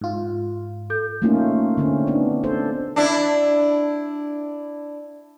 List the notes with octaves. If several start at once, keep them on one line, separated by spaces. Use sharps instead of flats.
G#2 F4
A4 G6
A3 A#3 C#4 D#4 F4
D3 C4 C#4
B3 D4 D#4
D4 A4 C5
D4 E4